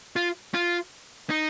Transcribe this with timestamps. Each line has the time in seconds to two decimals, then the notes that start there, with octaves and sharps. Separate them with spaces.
0.16 F4
0.54 F4
1.30 D#4